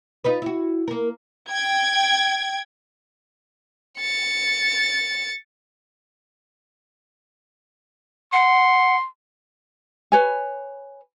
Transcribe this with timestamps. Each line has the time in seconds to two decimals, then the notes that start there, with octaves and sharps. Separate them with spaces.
0.24 D#4 F4 B4
0.42 E4 F#4
0.88 A#3 A#4
1.51 G5 G#6
3.99 A6 C#7
8.33 F#5 C6
10.12 B4 C#5 G#5